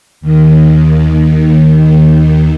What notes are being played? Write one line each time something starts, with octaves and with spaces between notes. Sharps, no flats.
D#2 D#3